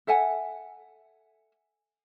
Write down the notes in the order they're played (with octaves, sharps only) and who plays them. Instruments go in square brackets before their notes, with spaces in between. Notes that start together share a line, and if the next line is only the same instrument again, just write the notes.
[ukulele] A4 E5 F#5 G#5